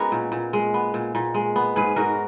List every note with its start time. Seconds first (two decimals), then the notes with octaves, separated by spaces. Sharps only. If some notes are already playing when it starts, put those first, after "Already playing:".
Already playing: G#3 B3 C#4 D#4 F#4 A#4 C#5
0.12 A#2
0.32 A#2
0.53 G#3
0.74 B3
0.94 A#2
1.15 A#2
1.34 G#3
1.56 B3
1.76 G#2 G#4 B4
1.96 G#2 F#4 A#4